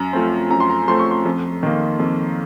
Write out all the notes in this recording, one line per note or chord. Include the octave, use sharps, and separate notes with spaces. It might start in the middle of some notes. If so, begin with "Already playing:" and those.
Already playing: F#2 A#5
F3 A3 C4
F#2 A#5
C6
A#5
F3 A3 C4 C6
C#6
C6
F2
D#3 A#3
F2